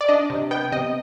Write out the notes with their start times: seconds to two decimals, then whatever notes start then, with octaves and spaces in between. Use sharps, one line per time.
0.01 D5
0.08 D4 D#5
0.30 C3
0.51 B3 G5
0.72 C3 D#5